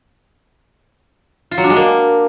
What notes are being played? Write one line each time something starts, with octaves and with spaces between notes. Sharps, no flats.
F4
F#3
D4
G#3
A#3